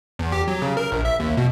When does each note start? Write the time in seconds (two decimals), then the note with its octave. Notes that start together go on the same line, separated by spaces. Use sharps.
0.19 E2
0.32 G4
0.48 F#3
0.62 C#3
0.77 A#4
0.92 A#1
1.05 E5
1.20 D#2
1.37 B2